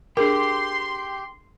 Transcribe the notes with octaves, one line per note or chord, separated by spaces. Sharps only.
D4 G4 G#4 A#4 C6